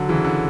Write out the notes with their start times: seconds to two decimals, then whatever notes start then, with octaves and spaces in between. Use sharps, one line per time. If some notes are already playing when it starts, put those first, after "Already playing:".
Already playing: D3 F#3
0.09 C#3 E3
0.25 D3